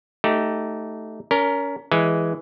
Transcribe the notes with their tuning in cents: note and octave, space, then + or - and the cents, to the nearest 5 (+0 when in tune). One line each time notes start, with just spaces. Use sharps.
A3 +0 D#4 +0 G4 -20
C#4 +30 A#4 +0
E3 +0 G#3 +0